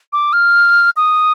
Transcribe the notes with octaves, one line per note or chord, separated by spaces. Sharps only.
D6
F6
D#6